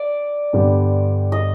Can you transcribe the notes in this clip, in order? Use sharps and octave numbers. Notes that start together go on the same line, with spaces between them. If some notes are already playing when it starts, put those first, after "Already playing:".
Already playing: D5
G2 D3 G3 B3 D4
D#5